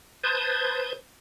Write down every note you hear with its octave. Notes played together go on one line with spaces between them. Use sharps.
B4 C5 A5 D#6 G6 G#6